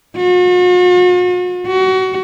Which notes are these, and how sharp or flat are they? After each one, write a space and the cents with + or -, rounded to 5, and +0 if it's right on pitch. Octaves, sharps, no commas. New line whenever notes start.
F#4 -45
F#4 +25